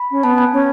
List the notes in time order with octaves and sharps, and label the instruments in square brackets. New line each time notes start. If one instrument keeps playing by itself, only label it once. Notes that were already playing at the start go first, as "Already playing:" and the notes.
Already playing: [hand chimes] B5
[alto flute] C#4
[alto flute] B3 [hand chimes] A5
[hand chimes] G#5
[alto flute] C#4